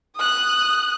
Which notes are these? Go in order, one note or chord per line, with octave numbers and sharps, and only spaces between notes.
D#6 F#6